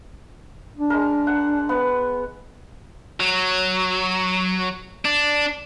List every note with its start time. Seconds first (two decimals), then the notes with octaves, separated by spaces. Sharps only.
0.77 D4
0.90 G#3 A#4
1.27 F#5
1.69 B3
3.20 F#3
5.05 D4